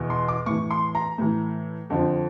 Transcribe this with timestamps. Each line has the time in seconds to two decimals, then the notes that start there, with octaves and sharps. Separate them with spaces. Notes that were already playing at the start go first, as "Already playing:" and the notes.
Already playing: E2 B2
0.10 C6
0.28 D6
0.46 A2 E3 C#6
0.71 C6
0.95 A#5
1.18 A2 E3
1.90 F2 D3 F3